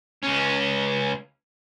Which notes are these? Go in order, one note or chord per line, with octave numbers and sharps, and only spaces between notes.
C#2 C#4